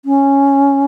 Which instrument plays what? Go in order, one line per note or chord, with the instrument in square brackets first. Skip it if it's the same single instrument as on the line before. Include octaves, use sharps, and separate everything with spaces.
[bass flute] C#4